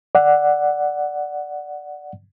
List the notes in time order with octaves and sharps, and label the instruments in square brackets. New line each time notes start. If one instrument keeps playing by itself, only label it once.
[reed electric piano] D5 F#5